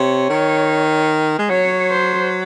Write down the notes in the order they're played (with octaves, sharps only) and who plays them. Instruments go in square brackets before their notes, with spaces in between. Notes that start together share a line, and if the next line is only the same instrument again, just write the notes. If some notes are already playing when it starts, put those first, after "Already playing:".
Already playing: [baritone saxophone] C3 [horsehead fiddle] C#5
[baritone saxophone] D#3
G#3
[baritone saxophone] F#3 [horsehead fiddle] C#5
[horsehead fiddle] C5